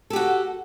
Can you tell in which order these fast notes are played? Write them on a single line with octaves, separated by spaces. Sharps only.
A4 G4 F#4